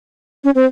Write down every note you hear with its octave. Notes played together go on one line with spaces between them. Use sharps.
C#4
C4